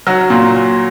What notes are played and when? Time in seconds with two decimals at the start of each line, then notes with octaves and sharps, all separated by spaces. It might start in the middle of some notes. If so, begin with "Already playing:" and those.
0.07 F#3
0.30 A#2